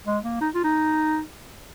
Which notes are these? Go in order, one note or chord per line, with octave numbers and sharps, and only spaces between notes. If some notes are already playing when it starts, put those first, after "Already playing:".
G#3
A#3
D#4
F4
D#4